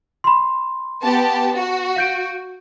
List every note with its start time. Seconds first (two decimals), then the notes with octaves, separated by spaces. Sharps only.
0.24 B5 C6
1.02 B3 G4 A5
1.55 F#4
1.96 F5 G6 D7